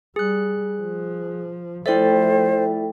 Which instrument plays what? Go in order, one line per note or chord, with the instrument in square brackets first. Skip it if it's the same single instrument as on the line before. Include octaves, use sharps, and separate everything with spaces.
[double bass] G3 [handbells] G#4 F#6
[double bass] F3
[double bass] F3 A3 [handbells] E4 D5 E5 [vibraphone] A4 G5 [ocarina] C5